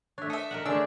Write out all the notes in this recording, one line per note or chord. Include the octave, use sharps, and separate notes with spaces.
A3 D4 C#5 E5
A4 E5 D#6
A#4 D#5 F#5
D3 A3 D4 G#4 C#5 E6